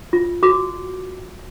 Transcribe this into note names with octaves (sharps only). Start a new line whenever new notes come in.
F4
F#4 D6